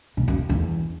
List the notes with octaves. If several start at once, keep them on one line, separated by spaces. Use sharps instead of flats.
B2
F#2
E2